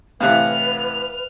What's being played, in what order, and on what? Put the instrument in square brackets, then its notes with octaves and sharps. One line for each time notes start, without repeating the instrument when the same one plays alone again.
[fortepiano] A2 C3 E3 [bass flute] B4 [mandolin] F5 F#5 [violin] F6